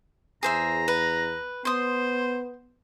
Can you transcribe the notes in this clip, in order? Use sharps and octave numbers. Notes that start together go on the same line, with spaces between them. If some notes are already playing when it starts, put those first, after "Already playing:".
E2 G#4 C5 E5 A#5
B4
B3 C5 C6 D#6